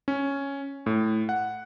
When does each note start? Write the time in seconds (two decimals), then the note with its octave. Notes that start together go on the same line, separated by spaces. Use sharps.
0.08 C#4
0.86 A2
1.29 F#5